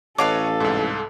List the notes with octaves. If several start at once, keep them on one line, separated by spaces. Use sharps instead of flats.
A1 A4 B4 C#5 D#5 F5 A5 D6
C2 G#2